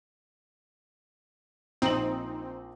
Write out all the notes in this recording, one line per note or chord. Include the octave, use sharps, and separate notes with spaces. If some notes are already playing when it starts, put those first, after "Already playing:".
A#1 C4 D#4 F#7